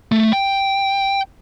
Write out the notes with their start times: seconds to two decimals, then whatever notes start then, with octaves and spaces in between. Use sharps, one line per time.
0.12 A3
0.33 G5